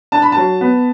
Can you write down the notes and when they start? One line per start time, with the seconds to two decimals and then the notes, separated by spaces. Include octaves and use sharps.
0.12 D4 A5
0.22 B5
0.32 F#3 A5
0.61 B3